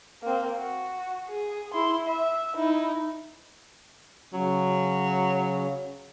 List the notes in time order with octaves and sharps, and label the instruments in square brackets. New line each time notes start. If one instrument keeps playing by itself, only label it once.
[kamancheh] A#3 C4
F#4
G#4
E4 C6
E5
D#4 E4
[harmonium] C#3 C#4 [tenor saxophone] F#3